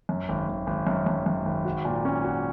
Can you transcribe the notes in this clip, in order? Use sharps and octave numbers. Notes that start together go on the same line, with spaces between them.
F#2
G#1
G#1
G#1
F#2
F#2
F#2
G#1
F#4
A#2
C#4
F#4